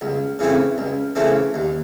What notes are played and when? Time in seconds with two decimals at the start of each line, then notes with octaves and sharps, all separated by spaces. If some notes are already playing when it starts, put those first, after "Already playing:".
0.01 C#2
0.39 C#3 E3 A3 C4
0.78 C#2
1.15 C#3 E3 A3 C4
1.54 D#2